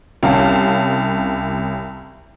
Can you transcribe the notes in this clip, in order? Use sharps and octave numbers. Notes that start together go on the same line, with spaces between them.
C2 C#4 F5 A5